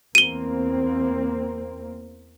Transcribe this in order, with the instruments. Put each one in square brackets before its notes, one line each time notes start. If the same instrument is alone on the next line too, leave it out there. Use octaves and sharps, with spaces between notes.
[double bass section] E2 A#3 C4 [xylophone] D#7 G7